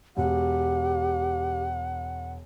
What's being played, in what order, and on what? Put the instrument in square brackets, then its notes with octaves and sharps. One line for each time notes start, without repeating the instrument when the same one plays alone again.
[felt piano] E1 [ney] G4 [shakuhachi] F#5